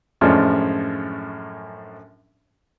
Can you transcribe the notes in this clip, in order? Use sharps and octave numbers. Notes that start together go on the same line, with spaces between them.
F#2 A2 F3 G#3 C#4 D4